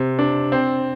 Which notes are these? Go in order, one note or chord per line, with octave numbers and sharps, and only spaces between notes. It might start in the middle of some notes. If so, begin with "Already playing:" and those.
Already playing: C3
D4
C4